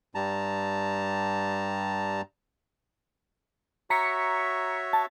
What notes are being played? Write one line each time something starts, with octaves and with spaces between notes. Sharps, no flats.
G2 G3 A5 A#5
F#4 C#5 E5 A#5 B6 C#7
A5